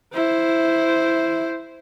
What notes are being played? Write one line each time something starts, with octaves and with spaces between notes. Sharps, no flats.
E4 C5